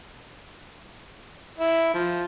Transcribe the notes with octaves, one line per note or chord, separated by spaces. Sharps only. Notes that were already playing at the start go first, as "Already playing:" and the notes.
E4
F3